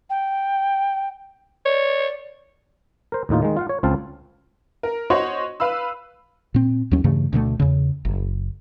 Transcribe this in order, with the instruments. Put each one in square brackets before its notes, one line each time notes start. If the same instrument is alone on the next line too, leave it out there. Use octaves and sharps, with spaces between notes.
[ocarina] G5
[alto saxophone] C#5 [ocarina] D5
[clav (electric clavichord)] A#4 C5
D#2 A2 D#4 F4
D#3 G#3
F4 F5 F#5
C#5
C#2 C4 F4 F5 A5
[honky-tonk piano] A#4
F#4 C5 C#5 D#5 C6 C#6
B4 F5 B5 E6
[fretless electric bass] A#2 C4
D#2 F#3 C#4
G2 C#3 E3 A3
D2 B2 G#3 A3
E2 C#3
F#1